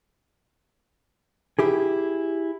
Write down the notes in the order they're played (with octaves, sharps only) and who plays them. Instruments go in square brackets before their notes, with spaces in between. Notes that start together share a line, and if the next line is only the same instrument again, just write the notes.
[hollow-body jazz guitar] E4 G4 G#4